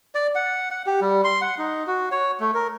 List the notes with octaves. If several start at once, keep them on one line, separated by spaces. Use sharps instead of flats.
D5
F#5
F#5
G4
G3
C6
F#5
D#4
F#4
C#5
A3
A#4